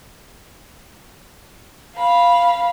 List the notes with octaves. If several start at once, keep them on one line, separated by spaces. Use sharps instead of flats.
F5 B5